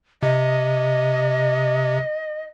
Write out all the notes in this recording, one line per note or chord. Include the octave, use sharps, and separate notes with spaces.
C3 D#5